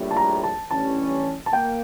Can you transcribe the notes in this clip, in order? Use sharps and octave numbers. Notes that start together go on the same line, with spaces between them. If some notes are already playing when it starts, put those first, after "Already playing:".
Already playing: A#1 A2 G3
A5
A#5
A5
A1 G2 E3 G3 C#4 A5
A5
A#3 G5